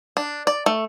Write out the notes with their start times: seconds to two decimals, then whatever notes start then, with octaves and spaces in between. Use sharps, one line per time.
0.17 D4
0.47 D5
0.66 A3